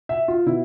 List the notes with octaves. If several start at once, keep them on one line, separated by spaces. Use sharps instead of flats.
E5
F4
B2 E4